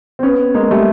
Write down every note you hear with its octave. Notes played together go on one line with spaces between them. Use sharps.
C4
B3 C#4
G#3 A#3
G3 A3